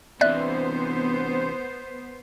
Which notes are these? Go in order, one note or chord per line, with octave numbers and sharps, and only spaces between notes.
C3 E3 B3 C5 D5 E5 F#6